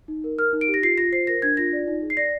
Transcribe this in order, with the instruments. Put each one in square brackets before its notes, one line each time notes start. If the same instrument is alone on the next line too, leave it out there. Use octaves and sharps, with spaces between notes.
[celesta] D#4
A#4
A#4 F6
D#4
D7
G4
A#6
F4 C7
F4 A#6
C5 C7
A#4 A#6
D4 G#6
F4 A#6
D5
D#4
G#4
C7
D5 A#6